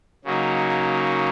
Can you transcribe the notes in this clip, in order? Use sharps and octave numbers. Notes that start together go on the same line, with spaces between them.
C#3 F#3 A#3 D#4